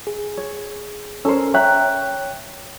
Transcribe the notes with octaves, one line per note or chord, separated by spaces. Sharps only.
G#4
C#5
C#4 A4 A#4 C5
C#5 E5 G5 A#5 F#6